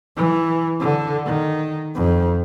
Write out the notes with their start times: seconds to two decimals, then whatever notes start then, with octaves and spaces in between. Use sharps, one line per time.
0.16 E3
0.80 D3
1.25 D#3
1.95 F2